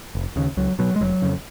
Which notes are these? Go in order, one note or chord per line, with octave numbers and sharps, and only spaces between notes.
F1
D#2 C#3
C#2 F#3
B2 F#3
G#3
F1 F#3
F2 C#3